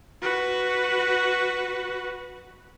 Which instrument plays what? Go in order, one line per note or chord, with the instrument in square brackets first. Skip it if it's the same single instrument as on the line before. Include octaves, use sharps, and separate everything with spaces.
[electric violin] F#4 B4